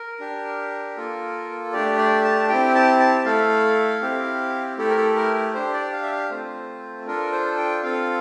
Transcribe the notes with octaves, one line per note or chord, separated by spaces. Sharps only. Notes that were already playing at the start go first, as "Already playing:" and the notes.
Already playing: A#4
D4 G4
A#3 F4 A4
A3 D4 G4 D5
D5
A5
C4 E4 G4 G5
A5
A5
A3 E4 A4 F5
C4 E4 G4
A3 E4 G4 A4
A#4
A4
A#4
D4 G4 C5
D5
F5
E5
F5
A3 C4 F4 C5
D4 F4 A4 A#4
C5
G5
C4 F4 A4 F5